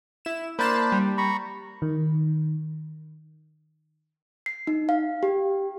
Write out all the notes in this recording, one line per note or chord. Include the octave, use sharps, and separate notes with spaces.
E4 E7
A#3 D4 C5 A5 B5 E7
G3
A#5 B5 C#6
D#3
C7
D#4
F5
G4